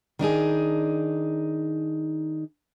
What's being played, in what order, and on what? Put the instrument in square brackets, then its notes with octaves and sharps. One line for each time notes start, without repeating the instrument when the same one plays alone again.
[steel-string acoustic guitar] D#3 D4 D#4 G#4